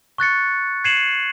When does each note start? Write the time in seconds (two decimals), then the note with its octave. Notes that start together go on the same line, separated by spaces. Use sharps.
0.18 C#6 F#6 A6 C#7
0.84 G#6 C7 C#7 D#7 E7 F#7